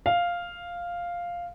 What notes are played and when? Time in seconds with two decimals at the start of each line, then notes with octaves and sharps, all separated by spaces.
0.06 F5